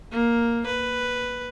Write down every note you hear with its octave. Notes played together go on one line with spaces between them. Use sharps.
A#3
B4